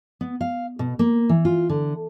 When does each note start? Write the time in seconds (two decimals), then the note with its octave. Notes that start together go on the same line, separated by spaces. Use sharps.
0.21 B3
0.41 F5
0.79 B2
0.99 A#3
1.29 E3
1.45 F4
1.70 D3